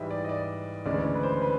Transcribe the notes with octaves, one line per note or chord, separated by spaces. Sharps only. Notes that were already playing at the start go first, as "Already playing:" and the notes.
Already playing: G#2 E3 G3 D#5 E5
D5
D#5
D5
D2 C#3 E3 G#3 D5
D5
B4
C5
B4